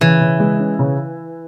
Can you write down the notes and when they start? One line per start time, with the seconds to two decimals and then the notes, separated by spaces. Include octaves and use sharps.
0.01 C#3 E3
0.21 C#3
0.40 G#3
0.60 C#4
0.79 C#3